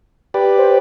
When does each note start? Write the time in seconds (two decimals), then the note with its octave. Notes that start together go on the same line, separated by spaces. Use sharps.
0.34 G4 B4 D5
0.58 C5